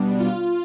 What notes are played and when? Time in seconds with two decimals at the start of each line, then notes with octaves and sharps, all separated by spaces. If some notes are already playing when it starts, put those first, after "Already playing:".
Already playing: B2 G3 B3 D4
0.20 F4